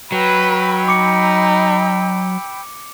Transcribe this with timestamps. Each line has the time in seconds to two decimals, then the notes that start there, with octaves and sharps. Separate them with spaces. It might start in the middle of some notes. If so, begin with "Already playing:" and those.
0.12 F#3 B4 G5 B5 E6
0.88 D#4 D6 C#7